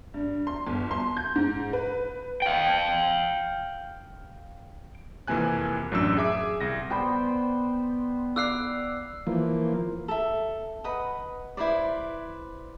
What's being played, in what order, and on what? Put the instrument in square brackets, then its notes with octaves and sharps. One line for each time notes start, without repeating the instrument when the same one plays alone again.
[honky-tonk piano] G2
C6
G1
C6
G6
G#2
B4
[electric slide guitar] F5 G5
[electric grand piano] F2 C3 E3 A#3 G#5 F#6
A1 F#2 F#3 D4 E6
G#4 E5 D6
C2 A#6
[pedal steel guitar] B3 C5 [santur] D5 G5 B5
[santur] D5 F5 [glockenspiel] E6 F#6 C7
[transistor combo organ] E3 F3 A#3
[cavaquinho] A4 E5
B4 D#5 F#5
E4 B4 C5 D5